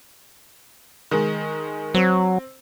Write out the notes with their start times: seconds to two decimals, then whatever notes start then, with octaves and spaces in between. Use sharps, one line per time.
1.11 D#3 G#3
1.94 F#3 C4